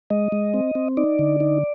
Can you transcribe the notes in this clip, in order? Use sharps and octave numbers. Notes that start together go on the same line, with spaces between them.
G#3 D#5
G#3
C4
C4
D#4 D5
D3
D#4